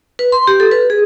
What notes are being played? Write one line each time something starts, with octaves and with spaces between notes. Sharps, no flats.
B4
C6
G4
A4
B4
G#4